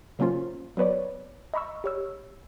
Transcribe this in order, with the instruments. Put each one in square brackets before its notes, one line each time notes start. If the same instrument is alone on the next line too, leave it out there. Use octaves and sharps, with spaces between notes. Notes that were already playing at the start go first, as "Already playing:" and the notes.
[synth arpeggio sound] C#3 F#3 A#3 C#4 F4 C5
F#3 B3 B4 C#5 D5
D#5 A#5 B5 C#6 E6
G4 C#5 E6